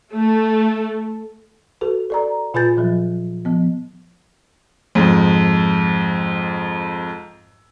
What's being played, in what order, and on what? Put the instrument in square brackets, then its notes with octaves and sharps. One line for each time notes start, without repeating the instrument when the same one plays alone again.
[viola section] A3
[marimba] F#4 A4 B4
A4 D5 A#5
A#2 F4 B4 G#5 G6 A6
A#2 F3 F#3
F3 B3
[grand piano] F2 G#2